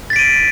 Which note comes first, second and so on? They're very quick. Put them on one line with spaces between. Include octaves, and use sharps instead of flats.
A6 B6 D7 D#7